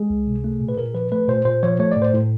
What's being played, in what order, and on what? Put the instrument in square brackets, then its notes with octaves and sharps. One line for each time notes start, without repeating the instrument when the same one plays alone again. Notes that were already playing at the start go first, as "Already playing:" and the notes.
Already playing: [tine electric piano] G#3 G#4
C#2
C3
A3
A#2
B4
A#2 A#4
F3 B4
A3 B4
A#2 C5
A#2 C5
F3 C#5
A3 C#5
A2 D5
C5
A2